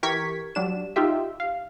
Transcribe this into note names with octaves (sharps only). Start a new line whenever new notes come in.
E3 G4 A#4 C#6 G#6 B6
F#3 G3 D4 E7
D#4 F4 G4 E5
F5